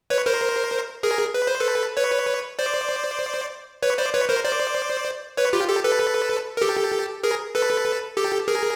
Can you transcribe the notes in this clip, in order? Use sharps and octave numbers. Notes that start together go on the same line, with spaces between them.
B4 C#5
A#4 C5
G#4 A#4
B4
C5
A4 B4
B4 C#5
C5 D5
B4 C#5
C5 D5
B4 C#5
A#4 C5
C5 D5
B4 C#5
F4 G4
G4 A4
A4 B4
A#4
G4 A4
G#4 A#4
A4 B4
G4 A4
G#4 A#4